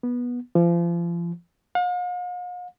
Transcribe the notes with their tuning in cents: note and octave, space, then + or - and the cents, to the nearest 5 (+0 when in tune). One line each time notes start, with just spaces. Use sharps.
B3 -15
F3 -35
F5 +45